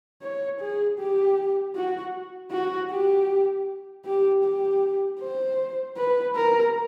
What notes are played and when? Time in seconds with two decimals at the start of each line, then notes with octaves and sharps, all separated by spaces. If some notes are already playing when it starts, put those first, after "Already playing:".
0.22 C#5
0.60 G#4
0.99 G4
1.75 F#4
2.51 F#4
2.90 G4
4.05 G4
4.43 G4
5.20 C5
5.97 B4
6.35 A#4